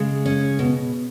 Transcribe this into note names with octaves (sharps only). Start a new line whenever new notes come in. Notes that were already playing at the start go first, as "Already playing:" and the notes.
Already playing: C#3 G#3
C#4
B2